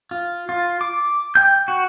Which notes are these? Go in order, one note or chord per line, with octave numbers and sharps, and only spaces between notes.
F4
F4
D6
G5 G6
F#4